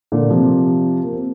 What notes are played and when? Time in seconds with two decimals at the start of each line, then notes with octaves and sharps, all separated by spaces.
0.12 A#2 D3
0.30 C3 F3
1.04 A#3
1.12 C4